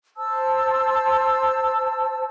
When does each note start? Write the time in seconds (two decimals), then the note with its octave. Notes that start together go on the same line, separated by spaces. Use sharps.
0.16 C5 A5 E6